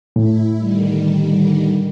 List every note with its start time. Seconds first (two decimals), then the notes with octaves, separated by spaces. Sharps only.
0.16 A2 E4
0.58 D3 D#3 G3